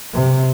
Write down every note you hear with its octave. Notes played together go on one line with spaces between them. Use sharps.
C3